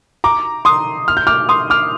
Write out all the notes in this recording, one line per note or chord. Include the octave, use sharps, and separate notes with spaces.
A#5 D6
C6 D#6
F6
G6
D6 F6
C6 D#6
D6 F6